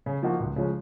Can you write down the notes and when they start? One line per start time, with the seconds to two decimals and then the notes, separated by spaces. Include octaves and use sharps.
0.06 C#3
0.23 F3 A#3 D#4 F#4
0.40 C#2
0.56 C#3 F3 G#3 C#4